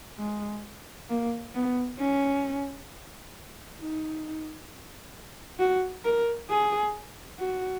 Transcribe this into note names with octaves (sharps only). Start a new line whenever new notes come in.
G#3
A#3
B3
C#4
D#4
F#4
A#4
G#4
F#4